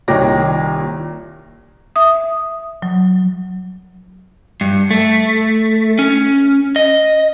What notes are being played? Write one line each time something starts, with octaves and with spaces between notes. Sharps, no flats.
C2 A#2 D#3 C#5 D6 A#6
E5 D#6
F#3
G2
A3
C#4
D#5